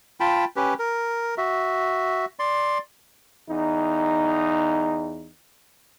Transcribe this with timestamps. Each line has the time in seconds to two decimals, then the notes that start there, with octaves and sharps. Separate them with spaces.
0.20 F4 G5 A5 B5
0.56 C#4 G4 B4
0.79 A#4
1.38 F#4 E5
2.39 D5 C6
3.49 E2 D#4